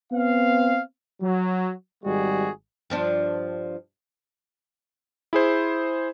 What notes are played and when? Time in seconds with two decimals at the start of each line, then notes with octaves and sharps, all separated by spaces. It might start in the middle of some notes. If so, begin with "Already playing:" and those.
0.12 B3 C4 F5
1.22 F#3
2.03 G#1 G3 G#3 F#4 G#4
2.90 G2 F3 D4
5.33 E4 G#4 C5